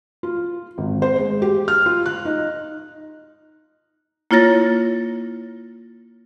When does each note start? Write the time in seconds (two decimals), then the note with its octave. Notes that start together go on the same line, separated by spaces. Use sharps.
0.23 F4
0.78 G#1
1.02 C5
1.18 G#3
1.42 G4
1.68 F6
1.86 F4
2.06 F#6
2.25 D#4
4.31 A#3 E4 F4 C#5 A6 A#6